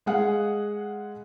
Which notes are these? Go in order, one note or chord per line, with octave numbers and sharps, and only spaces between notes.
G#3 G#4 F5 F#5